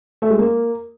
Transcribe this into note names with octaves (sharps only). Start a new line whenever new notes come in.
A3
G#3
A#3